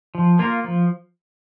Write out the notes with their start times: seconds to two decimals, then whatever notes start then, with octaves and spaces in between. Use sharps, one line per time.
0.15 F3
0.39 A#3 F4 A#4
0.64 F3